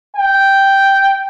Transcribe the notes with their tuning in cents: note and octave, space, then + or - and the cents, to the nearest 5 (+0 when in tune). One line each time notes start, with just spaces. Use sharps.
G5 -5